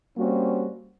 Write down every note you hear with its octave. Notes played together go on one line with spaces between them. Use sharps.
G3 A#3 C4 C#4 F#4